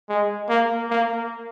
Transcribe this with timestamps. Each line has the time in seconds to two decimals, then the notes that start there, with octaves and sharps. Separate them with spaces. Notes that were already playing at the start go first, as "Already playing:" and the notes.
0.09 G#3
0.49 A#3
0.90 A#3